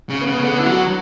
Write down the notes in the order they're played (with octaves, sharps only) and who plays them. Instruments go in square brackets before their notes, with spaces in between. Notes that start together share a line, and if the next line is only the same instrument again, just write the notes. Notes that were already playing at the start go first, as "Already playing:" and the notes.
[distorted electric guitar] C#3
[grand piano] B3
[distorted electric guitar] C#3
[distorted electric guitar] D3 [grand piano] B3
[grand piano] E4
[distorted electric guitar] F#3 [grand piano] F#4